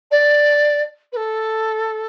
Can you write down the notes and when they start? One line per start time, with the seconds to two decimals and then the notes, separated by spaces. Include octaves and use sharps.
0.11 D5
1.12 B4
1.16 A4